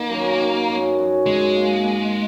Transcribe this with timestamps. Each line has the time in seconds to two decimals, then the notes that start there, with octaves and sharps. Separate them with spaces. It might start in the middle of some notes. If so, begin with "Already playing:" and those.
Already playing: D#3 A#3
0.10 F#2
0.40 D#3
0.68 F#2
0.98 F#2
1.26 F#2 G#3
1.56 A#3
1.85 A#3